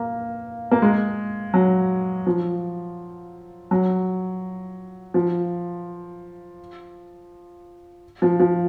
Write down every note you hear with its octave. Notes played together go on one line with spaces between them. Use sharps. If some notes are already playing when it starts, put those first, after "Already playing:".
Already playing: A#3
A#3
G#3
F#3
F3
F#3
F3
F3
F3